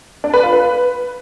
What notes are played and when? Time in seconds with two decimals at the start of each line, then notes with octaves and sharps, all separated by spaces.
0.24 D4
0.34 B4
0.43 F4
0.53 B4